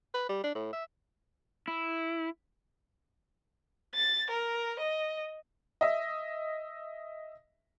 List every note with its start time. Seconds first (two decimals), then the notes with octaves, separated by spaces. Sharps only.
0.14 B4
0.29 G3
0.43 D4
0.55 A2
0.73 E5
1.68 E4
3.95 A6
4.30 A#4
4.80 D#5
5.81 D#5 E5